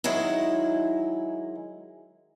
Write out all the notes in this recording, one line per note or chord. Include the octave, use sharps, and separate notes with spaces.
D#3 F#3 G#3 E4